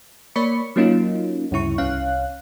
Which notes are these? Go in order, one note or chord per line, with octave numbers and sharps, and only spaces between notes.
A#3 C#5 D5 B5 C#6 C#7
F#3 A#3 C#4 D#4 F4
D2 G2 C#3 E4 C#6
C2 C#4 F5 F#6